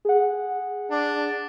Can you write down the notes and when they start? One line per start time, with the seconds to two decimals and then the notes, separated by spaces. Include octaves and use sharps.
0.05 G#4 F#5
0.90 D4